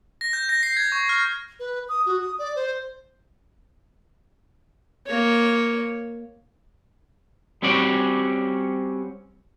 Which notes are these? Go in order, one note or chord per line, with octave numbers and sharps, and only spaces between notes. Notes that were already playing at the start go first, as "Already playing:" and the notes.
A#6
G6
A#6
C7
G#6
C#6
F6
B4
D#6
F#4
D#6
D5
C5
A#3 C#5
G3 C4 C#4 F#4 D5